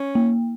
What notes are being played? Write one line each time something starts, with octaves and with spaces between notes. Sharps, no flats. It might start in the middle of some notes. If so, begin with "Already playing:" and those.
Already playing: C#4
A#3